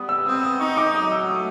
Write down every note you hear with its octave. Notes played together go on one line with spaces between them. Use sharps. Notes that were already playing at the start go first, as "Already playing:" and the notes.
Already playing: G3 B3 D#6
E6
C4 D#6
D#6
D#4 C#6
D6
F#3 D#6
E6
A3 D#6